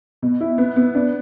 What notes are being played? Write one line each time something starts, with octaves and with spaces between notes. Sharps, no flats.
B2
E4
B3
B3
D4